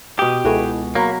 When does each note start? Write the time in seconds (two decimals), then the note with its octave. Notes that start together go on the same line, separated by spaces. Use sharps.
0.19 B2 G4 F5 D#6
0.45 C#2 E4 F#4 G#4 A4 B4 C#5
0.95 F#3 A#3 C#5 B5